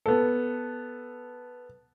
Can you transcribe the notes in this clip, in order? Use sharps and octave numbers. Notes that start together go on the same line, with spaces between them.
B3 A4